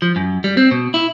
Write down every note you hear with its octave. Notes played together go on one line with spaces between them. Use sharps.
F3
F#2
G3
C4
B2
E4